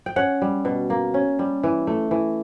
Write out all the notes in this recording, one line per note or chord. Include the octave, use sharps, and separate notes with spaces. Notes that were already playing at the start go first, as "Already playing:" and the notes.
G5
C#4 F#5
G3
B2
A#3
C#4
G3
E3
A3
E3